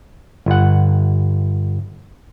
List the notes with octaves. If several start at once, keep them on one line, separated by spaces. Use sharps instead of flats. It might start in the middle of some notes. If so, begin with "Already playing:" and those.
G1 F#5